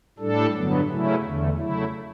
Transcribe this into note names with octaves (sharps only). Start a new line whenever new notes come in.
A2 G3 D4 A4
G2 D3 F#3 B3
C#3 F#3 A3 C#4 E4
E2 D3 A3
C#3 F#3 A3 E4